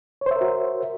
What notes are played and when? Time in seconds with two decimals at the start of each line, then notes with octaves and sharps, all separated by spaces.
0.21 C#5
0.26 C5
0.31 E5
0.36 A#4
0.41 F#4